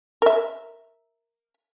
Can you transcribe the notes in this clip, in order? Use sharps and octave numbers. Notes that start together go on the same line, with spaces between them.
A#4 E5